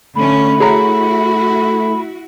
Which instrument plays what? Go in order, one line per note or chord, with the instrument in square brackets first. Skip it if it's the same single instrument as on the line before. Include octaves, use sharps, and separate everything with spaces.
[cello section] D3 C#4 [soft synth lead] A3 [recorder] B5
[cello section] E4 F#4 [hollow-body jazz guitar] G#4 C#5 A#5